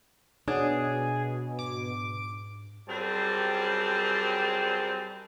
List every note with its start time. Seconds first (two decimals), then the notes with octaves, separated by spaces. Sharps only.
0.48 B2 D4 G#4 C#5 D5 F#5
1.59 G#2 D6
2.88 F#2 G3 C4 G#4 C5 A5